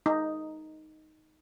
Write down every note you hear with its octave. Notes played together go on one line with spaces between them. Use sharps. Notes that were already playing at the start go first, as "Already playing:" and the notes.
D#4